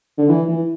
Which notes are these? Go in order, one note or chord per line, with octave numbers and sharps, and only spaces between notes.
D3
E3
E3